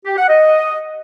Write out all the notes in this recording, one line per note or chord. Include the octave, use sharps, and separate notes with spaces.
G4
F#5
D#5